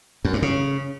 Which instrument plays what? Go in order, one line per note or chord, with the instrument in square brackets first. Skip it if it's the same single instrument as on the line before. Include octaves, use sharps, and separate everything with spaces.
[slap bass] F#2
G2
C#3